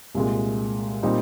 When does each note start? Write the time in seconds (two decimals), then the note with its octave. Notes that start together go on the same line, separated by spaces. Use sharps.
0.15 C2 A#2 G#3
1.02 A#2 G3 C4 D#4